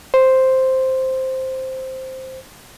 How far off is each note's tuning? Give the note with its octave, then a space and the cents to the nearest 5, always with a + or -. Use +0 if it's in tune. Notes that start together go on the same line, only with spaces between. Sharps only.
C5 +0